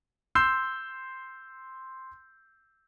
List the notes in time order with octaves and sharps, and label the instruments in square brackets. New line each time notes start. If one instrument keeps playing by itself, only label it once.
[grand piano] C6 E6 G6 C7